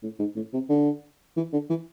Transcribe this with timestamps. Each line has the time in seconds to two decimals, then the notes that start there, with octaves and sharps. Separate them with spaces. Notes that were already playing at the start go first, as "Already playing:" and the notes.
0.03 A2
0.19 G#2
0.36 A2
0.53 C3
0.69 D3
1.37 E3
1.53 D3
1.70 E3